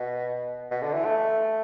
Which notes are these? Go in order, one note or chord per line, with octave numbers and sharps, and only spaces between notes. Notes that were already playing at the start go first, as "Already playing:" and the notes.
Already playing: B2
B2
D3
E3
A3